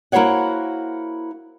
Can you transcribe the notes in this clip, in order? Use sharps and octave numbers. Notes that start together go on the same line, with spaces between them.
A#3 E4 F#4 C5 C#5 F#5